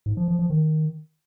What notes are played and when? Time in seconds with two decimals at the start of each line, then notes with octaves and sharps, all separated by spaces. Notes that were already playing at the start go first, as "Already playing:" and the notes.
0.06 G#2
0.17 F3
0.28 F3
0.39 F3
0.50 D#3